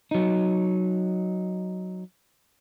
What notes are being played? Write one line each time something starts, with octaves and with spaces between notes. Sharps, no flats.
F#3 D#4